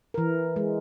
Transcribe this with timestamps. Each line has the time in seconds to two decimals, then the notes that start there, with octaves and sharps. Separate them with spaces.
0.14 E3 A#4
0.56 G#3